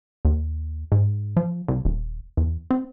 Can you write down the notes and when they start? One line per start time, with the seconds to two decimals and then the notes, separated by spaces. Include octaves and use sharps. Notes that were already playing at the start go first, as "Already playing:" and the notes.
0.25 D#2
0.92 G#2
1.37 F3
1.68 C2
1.85 D#1
2.37 E2
2.71 C4